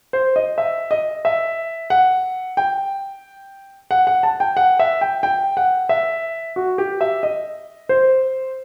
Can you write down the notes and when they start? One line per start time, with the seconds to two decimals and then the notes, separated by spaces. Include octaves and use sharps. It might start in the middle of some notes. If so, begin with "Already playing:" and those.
0.13 C5
0.36 D#5
0.58 E5
0.91 D#5
1.25 E5
1.90 F#5
2.57 G5
3.91 F#5
4.07 F#5
4.23 A5
4.40 G5
4.57 F#5
4.79 E5
5.01 G5
5.23 G5
5.57 F#5
5.89 E5
6.56 F#4
6.78 G4
7.01 E5
7.23 D#5
7.89 C5